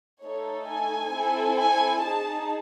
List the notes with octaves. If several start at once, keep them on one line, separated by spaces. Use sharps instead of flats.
A3 D#4 A4 C#5
G#5
C4 E4 A4
G#5
D#4 G#4 A5